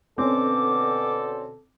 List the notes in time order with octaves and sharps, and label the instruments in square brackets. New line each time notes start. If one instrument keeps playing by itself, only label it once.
[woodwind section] B2 D3 [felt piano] C4 C#4 [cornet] A4 [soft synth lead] D6